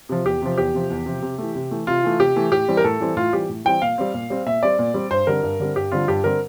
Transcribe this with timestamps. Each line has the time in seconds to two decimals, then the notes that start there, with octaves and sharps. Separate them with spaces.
0.09 C3 F3
0.26 E2 G4
0.42 C3 F3
0.58 E2 G4
0.74 C3 F3
0.90 E2
1.06 C3 F3
1.22 C3
1.38 E3 A3
1.55 C3
1.71 E3 A3
1.87 C3 F4
2.04 E3 A3
2.20 C3 G4
2.36 E3 A3
2.52 A2 G4
2.68 E3 G3 C4
2.77 A#4
2.84 A2 A4
3.01 E3 G3 C4
3.17 A2 F4
3.33 E3 G3 C4 G4
3.49 A2
3.65 E3 G3 C4 G5
3.82 A#2 F5
3.98 G3 C4
4.14 A#2
4.30 G3 C4
4.46 A#2 E5
4.63 G3 C4 D5
4.79 A#2
4.94 G3 C4
5.11 G2 C5
5.27 D3 G3 C4 A#4
5.43 G2
5.60 D3 G3 C4
5.76 G2 G4
5.92 D3 G3 C4 F4
6.08 G2 G4
6.24 D3 G3 C4 A#4